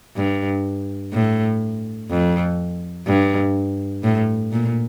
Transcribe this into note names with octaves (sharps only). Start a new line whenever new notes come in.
G2
A2
F2
G2
A2
A#2